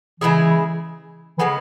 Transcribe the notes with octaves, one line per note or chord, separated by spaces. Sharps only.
C#3 E3 G#3 E4 G#4
C#3 E3 G#3 B3